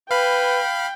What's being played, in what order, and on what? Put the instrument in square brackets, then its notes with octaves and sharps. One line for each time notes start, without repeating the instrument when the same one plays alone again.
[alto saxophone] B4 [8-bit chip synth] F5 B5 [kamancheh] G5